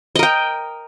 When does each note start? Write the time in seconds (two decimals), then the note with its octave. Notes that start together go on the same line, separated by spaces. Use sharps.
0.16 D#5
0.19 A#4
0.23 G5